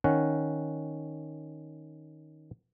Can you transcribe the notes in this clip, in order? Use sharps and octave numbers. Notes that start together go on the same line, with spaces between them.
D#3 C#4 F#5